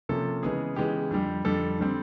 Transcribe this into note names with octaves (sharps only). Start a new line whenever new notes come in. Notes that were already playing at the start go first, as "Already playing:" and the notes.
C3 F3 A#3 C#4 A4
C#3 E3 G#3 B3 G#4
C#3 E3 G#3 B3 G4
F2 D3 G3
F2 D3 G3 A4
D3 G3 C4